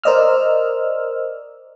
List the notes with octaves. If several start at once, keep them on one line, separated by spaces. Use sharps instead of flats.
A#4 C5 D5 D#5 E6 F6